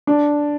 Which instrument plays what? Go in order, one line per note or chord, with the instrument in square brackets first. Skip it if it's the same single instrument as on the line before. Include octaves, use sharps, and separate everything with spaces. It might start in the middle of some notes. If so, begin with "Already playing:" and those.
[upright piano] D4